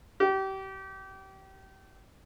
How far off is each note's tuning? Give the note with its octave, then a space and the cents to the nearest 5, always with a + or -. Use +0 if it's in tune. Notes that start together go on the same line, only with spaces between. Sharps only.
G4 -30